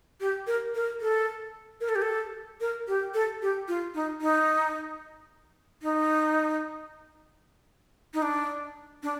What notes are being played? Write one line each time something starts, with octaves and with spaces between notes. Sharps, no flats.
G4
A#4
A#4
A4
A#4
A4
G4
A4
A#4
G4
A4
G4
F4
D#4
D#4
D#4
D#4
D4
D4